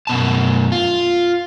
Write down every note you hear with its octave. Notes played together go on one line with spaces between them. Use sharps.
F#2 B2 A5
F4